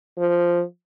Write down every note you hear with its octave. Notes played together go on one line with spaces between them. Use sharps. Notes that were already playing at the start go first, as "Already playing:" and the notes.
F3